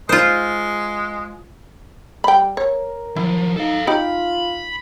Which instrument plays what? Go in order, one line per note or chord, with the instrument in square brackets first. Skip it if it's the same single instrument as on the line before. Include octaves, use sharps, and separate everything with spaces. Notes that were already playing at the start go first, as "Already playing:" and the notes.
[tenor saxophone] G#3 [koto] F4 C5
[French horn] G3 [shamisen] G5 B5
[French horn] A#4 [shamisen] C#5
[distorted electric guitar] F3 F#3 [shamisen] E4
[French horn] D#4 [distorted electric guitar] A4 F5
[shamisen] D#4 G4 [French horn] F4 [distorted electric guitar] B5